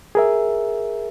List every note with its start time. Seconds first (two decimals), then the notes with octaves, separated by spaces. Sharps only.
0.15 G#4 A#4 E5